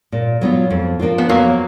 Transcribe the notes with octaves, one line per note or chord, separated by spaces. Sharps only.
A#2
F#3 B3 F4
F2
F3 A#3 D4 F4
B3
F2 F#3 A#3